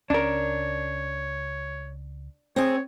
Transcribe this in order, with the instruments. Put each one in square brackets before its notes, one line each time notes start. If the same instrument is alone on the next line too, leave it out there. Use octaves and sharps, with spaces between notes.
[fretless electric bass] C#2 C#4 [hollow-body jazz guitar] D4 A#4 [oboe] C#5
[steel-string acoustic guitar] C4 G#4 [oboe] C#5